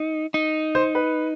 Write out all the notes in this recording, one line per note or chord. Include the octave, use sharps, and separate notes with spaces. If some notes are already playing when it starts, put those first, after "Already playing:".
Already playing: D#4
D#4
C5
B4